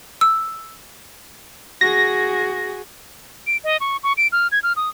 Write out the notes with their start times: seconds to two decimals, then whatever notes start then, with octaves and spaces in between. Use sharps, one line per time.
0.21 E6
1.81 F#4 G#4 A#6
3.47 D7
3.64 D#5
3.80 C#6
4.03 C#6
4.17 D7
4.32 F6
4.52 G#6
4.63 F6
4.76 D#6